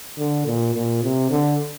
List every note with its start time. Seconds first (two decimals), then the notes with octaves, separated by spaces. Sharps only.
0.18 D3
0.46 A#2
0.74 A#2
1.03 C3
1.31 D3